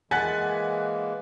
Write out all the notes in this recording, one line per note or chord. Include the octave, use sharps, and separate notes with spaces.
E3 G#3 A#3 F#5 G#5 F#6 A6 B6